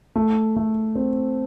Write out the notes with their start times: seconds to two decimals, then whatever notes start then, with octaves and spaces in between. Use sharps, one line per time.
0.16 A3
0.56 A3
0.96 C4